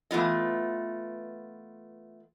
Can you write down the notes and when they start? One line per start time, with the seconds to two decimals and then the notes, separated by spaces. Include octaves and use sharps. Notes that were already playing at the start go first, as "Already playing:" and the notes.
0.11 E3 A3 B3 F4 D#5